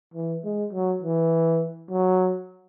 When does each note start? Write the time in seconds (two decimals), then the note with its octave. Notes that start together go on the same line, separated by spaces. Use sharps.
0.14 E3
0.44 G#3
0.73 F#3
1.03 E3
1.90 F#3